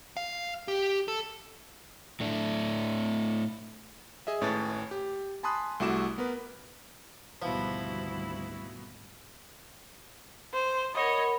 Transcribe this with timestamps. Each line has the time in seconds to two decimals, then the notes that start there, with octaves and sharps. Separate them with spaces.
0.17 F5
0.68 G4
1.08 A4
2.20 A2 A3 D4
4.27 G#4 D#5 E5
4.41 G#1 A2 C#4 B4 A5 A6
4.91 G4
5.43 G#5 A5 B5 C6 D#6 F#6
5.80 C2 A3 E4 F#4 D6 E7
6.18 B3 A#4 B4
7.42 G#1 D2 B2 F3 G3 B3 E4
10.53 C5
10.95 A#4 C#5 D#5 F#5 B5